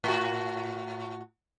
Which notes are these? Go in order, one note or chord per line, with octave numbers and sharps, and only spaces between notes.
A2 F#4